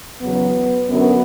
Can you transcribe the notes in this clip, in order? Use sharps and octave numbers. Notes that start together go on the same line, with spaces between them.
E2 C#3 F#3 B3
F#2 D3 F#3 B3